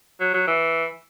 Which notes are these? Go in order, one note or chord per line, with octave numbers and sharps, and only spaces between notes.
F#3
F#3
E3